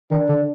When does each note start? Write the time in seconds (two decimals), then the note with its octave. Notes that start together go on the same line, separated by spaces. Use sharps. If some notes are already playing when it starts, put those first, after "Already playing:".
0.11 D#3 D4
0.29 D3